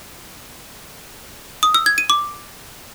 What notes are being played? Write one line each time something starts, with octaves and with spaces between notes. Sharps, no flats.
D#6
E6
G#6
D#7
D6